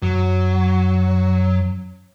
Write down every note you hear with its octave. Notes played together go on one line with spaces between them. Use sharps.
F#2 F#3